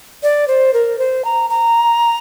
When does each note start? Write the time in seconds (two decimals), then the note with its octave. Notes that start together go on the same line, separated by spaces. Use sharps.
0.23 D5
0.48 C5
0.74 A#4
0.99 C5
1.25 A#5
1.50 A#5